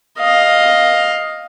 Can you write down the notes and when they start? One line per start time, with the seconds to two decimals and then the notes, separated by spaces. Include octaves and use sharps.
0.19 D#5 F5